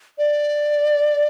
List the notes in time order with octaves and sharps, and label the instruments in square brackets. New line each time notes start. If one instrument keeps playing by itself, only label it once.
[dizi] D5